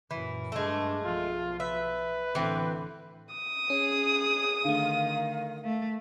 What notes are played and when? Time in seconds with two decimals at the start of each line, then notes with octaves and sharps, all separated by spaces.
0.11 F#2 A#2 E3
0.52 G2 G#3 A3 D4
1.04 B1 F3 F4
1.60 B4 E5
2.35 A1 D3 E3 C4
3.35 D#6
3.70 C#4 G#4
4.65 D3 D#3 A3 F5
5.64 A3